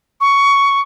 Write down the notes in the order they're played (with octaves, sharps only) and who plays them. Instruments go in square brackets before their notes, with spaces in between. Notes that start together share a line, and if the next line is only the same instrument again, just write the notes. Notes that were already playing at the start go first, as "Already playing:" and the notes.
[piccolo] C#6